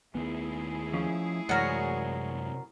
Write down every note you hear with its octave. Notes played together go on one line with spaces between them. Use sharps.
D#2 D#3 A3 B3 E4 G#4
F3 C#4
F#2 C3 E3 G#3 F#4 A#4 C#5 D5